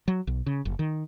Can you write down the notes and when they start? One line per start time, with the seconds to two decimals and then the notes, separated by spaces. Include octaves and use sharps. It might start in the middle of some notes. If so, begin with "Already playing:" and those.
0.08 F#3
0.27 B1
0.46 C#3
0.65 F#1
0.79 D#3